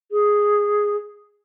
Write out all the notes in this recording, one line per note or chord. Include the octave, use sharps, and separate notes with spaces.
G#4